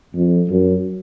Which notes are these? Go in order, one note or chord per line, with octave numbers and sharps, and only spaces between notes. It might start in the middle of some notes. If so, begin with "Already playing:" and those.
F2
F#2